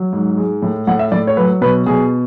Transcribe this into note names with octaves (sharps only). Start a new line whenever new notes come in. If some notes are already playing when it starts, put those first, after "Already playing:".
Already playing: F#3
G#2
G#3
A2
A2 F#5
E5
A2 D5
C#5
F#3 B4
B2 B4
B2 G#4